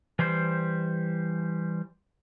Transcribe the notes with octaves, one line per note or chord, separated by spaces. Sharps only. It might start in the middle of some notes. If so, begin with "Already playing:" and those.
E3 G3 C5